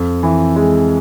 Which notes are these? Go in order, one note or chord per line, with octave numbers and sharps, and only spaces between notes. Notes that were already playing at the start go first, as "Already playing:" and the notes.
Already playing: F2
E3
G#3